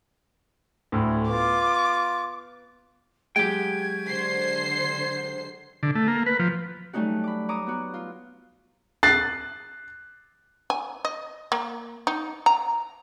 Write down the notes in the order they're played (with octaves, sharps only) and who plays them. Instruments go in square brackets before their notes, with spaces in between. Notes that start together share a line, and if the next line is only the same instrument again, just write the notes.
[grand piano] D2 A2
[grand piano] B3 [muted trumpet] F4 [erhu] D6
[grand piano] F#3 G#3 [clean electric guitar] G4 G5 [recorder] G#6
[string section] D3 C5 C7
[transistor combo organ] D3
A3
A#3
B4
F3
[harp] F#3 G3 A3 C#4 D#4 F#4
B5 D6
C#5 A#5 D6 D#6
B3 F#4
F4
[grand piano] F#6 A6 C7
[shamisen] G#5
D#5
A#3
D#4
A#5